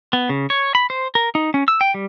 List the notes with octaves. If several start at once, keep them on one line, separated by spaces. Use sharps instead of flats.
B3
C#3
C#5
B5
C5
A#4
D#4
C#4
E6
G5
G3